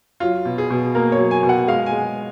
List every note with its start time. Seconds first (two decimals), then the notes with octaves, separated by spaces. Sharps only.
0.20 F#3 F4
0.45 B2
0.58 G#4
0.70 B2
0.95 A#3 A#4
1.12 C#5
1.19 F#3
1.31 G#5
1.43 B2
1.49 F#5
1.68 G#3 F5
1.86 G#5
1.92 G#3